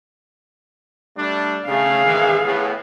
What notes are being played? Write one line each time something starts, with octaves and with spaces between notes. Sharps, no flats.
G3 A3 D4
C#3 A3 G#4 F5
G#1 D#3 E3
A2 B3